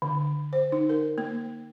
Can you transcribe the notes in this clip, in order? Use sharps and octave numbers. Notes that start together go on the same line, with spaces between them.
D3
C5
D#4
A#4
A#3